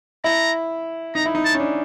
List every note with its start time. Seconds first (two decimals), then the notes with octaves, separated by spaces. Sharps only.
0.24 E4 A#5
1.15 D#4 A#5
1.26 E4
1.35 D#4
1.45 A5
1.55 C#4
1.60 D4